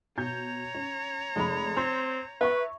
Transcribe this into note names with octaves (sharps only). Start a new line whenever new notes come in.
B2 C#5 A#5 G6 G#6
C#4
F1 G#3 B5
C4 C6 G6
B4 E5 C#6